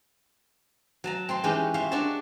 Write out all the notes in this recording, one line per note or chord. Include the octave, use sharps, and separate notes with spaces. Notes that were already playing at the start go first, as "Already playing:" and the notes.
F#3 A5 A#5
C4 A5 C6
E3 G#3 C#4 D#4 G4 C#5
F4 C#5 E5 F5
D4 F#4 A4 C#5 A5